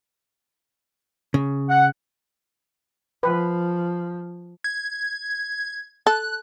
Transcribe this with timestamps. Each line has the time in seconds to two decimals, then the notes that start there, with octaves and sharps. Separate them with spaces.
1.34 C#3
1.69 F#5
3.23 F3 B4
4.64 G#6
6.07 A4 F#6